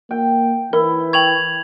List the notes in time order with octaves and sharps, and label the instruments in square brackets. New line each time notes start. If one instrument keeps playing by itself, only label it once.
[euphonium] A#3 [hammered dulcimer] G5
[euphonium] E3 [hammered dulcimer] E4 [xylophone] A#4
[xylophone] G5 C#6 [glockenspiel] G#6 F7 F#7